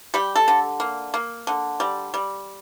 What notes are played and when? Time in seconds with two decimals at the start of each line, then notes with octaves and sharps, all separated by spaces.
0.14 G3 G4
0.36 A4
0.48 D3
0.80 A#3
1.14 A#3
1.47 D3
1.80 G3
2.14 G3